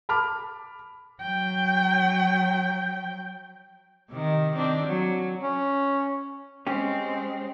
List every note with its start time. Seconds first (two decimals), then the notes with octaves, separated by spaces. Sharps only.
0.09 A5 B5 D6 F6
1.22 F#3 G5
4.10 C3 D#3
4.56 D#3 C4 D4
4.86 F#3
5.42 C#4
6.67 G#3 C4 C#4 G4